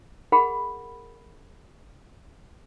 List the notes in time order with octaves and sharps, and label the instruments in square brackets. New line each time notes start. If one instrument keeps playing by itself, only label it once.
[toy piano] G#4 A#4 F#5 B5